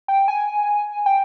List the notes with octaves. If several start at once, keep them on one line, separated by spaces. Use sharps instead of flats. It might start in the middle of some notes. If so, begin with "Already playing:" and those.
G5
G#5
G5